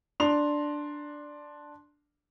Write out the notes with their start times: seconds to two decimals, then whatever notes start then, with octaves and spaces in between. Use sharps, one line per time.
0.20 D4 A#5 C6 F7